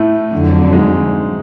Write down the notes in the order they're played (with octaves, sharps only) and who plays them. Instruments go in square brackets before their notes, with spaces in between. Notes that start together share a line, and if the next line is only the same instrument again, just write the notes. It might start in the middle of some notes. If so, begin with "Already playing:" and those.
Already playing: [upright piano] A2 A3
[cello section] F2 D3 F#3
[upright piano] G#2 G#3